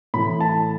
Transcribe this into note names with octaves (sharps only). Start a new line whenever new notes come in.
A2 E3 B5
A5